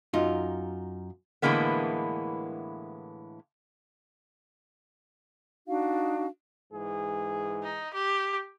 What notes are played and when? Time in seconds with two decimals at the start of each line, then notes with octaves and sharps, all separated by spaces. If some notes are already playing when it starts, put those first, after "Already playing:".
0.14 F#2 D#4 F4
1.42 A2 D3 E3 G#3 A#3 B3
5.67 D4 D#4 F#4 F5
6.72 G#2 E3 G#4
7.63 D#4
7.94 G4